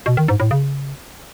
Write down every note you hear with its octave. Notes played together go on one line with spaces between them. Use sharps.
B2
D#3
G#2
A2
C#3